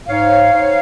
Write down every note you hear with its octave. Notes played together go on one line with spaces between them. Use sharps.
G#2 C#5 F5
G#2